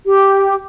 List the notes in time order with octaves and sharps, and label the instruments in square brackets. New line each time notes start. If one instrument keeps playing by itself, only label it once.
[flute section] G4